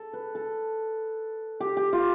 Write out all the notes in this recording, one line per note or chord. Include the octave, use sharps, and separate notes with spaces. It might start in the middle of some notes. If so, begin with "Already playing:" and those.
Already playing: A4
B4
A4
G4
G4
F4